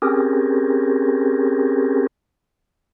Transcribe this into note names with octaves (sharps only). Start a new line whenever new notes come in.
C4 C#4 G4 G#4 A#4